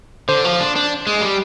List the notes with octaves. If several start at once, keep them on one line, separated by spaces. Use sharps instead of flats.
D3 C5
F3
D4
D4
G#3
G3